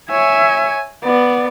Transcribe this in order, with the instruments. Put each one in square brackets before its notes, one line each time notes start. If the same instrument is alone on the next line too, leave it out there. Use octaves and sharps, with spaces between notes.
[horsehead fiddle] C#5 E5 [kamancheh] G#5
[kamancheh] B3 [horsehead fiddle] D5